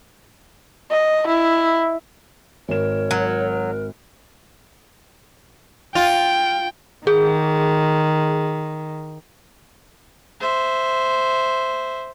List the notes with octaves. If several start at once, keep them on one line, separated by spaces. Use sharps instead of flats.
D#5
E4
G#1 A#4 C#5 E7
F#3
F4 G5
D#3 G#4
C5 E5